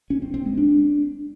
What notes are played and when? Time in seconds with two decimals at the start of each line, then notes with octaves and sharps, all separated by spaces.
0.10 C#4
0.22 C4
0.34 C4
0.46 G#3
0.57 D4